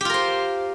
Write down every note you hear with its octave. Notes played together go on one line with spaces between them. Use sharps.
F4 G4 A#4 C5